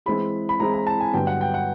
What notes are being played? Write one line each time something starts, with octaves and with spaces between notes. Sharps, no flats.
E3 G#3 C4 E4 G#4 B5
B5
E3 G#3 C4 E4 G#4 A#5
A#5
A5
G#5
G2 D3 F#3 B3 G5
F#5
G5
F#5